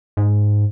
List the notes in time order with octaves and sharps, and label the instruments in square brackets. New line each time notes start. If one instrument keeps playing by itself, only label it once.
[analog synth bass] G#2